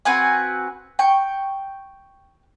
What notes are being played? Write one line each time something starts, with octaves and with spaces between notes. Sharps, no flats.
C4 F#4 B4 G#5
G5 C#6